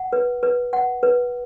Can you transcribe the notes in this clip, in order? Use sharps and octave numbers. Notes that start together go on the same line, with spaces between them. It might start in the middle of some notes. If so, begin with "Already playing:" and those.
Already playing: F#5
B4
B4
F#5
B4